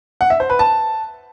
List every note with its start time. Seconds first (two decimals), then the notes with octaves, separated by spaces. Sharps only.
0.21 F#5
0.30 E5
0.40 C5
0.50 B4
0.59 A5